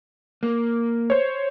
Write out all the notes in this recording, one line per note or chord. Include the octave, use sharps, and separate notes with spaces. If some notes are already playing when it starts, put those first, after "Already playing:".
A#3
C5 C#5